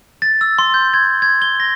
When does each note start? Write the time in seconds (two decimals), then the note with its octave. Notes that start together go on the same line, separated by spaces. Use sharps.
0.22 A6
0.41 E6
0.59 C6
0.74 G6
0.94 G#6
1.22 G#6
1.42 G7
1.60 A#6